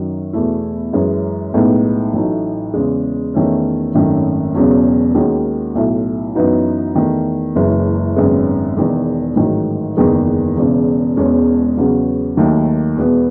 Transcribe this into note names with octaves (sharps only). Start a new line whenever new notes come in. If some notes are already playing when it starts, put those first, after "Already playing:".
Already playing: F#2 D#3 F#3
E2 B2 A3 E4
F#2 E3 G#3 C#4
B1 A2 G#3 B3 D#4
A1 A2 F#3 A3 D#4
E2 C#3 G#3
E2 D#3 A3 C#4
G#1 F#2 D#3 A3 C#4
E1 E2 C#3 F#3 C#4
D#2 D#3 G#3 C#4 F#4
B1 A2 F#3 A3 E4
F#2 E3 B3 D#4 F#4
E2 D#3 A3
F#1 F#2 E3 G#3
G#1 F#2 C#3 G#3 B3
E1 E2 D#3
A1 G#2 D#3 F#3
F#1 E2 D#3 G#3 B3
E1 E2 C#3
E1 E2 B2 G#3 C#4
E2 C#3 F#3 B3 F#4
D#2 D#3 F#3 A3 D#4
E2 B2 G#3 B3